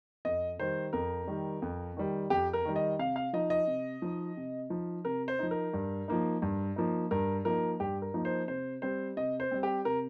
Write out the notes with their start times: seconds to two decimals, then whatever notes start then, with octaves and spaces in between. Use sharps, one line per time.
0.25 F2 D#5
0.59 D#3 G3 C5
0.93 F2 A#4
1.28 D#3 G3
1.62 F2
1.97 D#3 G3
2.30 F2 G4
2.53 A#4
2.65 D#3 G3
2.76 D#5
2.99 C3 F5
3.16 F5
3.33 F3 D#4 D#5
3.50 D#5
3.67 C3
4.02 F3 D#4
4.37 C3
4.70 F3 D#4
5.05 C3 A#4
5.28 C5
5.39 F3 D#4
5.51 A#4
5.74 G2
6.08 F3 A#3 D#4
6.42 G2
6.76 F3 A#3 D#4
7.11 G2 A#4
7.45 F3 A#3 D#4 A#4
7.80 G2 G4
8.02 A#4
8.14 F3 A#3 D#4
8.25 C5
8.48 C3 C5
8.82 G3 C4 C5
9.17 C3 D#5
9.40 C5
9.51 G3 C4
9.63 G4
9.85 C3 A#4